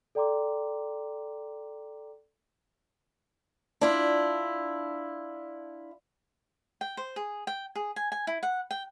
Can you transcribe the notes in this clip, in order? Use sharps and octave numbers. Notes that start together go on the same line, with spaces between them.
A4 D5 G5 A#5 C6 D6
D4 E4 F4
G5
C5
G#4
G5
G#4
G#5
G#5
E4
F#5
G5